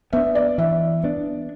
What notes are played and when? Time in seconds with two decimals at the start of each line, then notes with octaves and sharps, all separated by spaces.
0.13 B3 D4 E5
0.35 D5
0.58 E3 E5
1.04 B3 D4